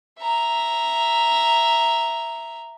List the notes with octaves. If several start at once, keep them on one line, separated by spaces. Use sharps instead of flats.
E5 A#5